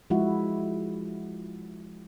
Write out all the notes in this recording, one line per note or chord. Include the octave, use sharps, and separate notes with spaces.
F3 G#3 E4 F#4